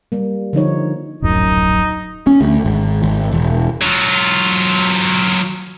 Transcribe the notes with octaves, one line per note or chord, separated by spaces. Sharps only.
G3 A#3
D3 F3 D#4 C#5
D1 A#1 F#2 D#4
C#4
D2
G#1
G#1
E1
F#3 F4